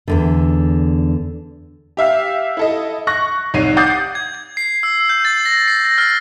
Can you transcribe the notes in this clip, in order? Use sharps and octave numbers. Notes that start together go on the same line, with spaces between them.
E2 G2 D3
G4 E5 F5
E4 A4 D#5
C#6 F#6 A#6
C2 D#4 C#5 C7 D#7
F#5 D6 D#6 G6 A6 C7
G#6
G#6
C7
E6
G6
A6
A#6
C7
A#6
F6